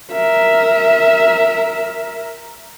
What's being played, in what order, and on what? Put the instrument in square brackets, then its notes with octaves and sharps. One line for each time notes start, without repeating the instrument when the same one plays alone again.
[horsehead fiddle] A#4 E5